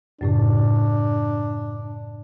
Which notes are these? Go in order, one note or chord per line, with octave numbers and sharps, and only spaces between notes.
F#2 A2 C#3 D4